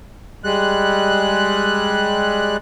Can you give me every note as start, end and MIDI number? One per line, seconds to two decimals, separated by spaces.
0.44 2.57 55
0.44 2.57 56
0.44 2.57 90